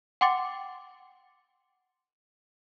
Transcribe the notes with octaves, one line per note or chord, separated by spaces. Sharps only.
F#5 G5 C6 D6 A6 C#7